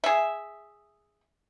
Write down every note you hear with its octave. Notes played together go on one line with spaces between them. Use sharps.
G#4 E5